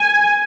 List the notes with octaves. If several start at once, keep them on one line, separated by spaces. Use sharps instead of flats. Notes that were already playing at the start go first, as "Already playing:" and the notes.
Already playing: G#5